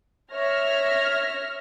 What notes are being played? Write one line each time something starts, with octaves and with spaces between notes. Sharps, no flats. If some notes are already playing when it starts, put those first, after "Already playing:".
C#5 E5 F6 A#6